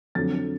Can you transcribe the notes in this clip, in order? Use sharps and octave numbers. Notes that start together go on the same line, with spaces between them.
F2 D3 F#3 A6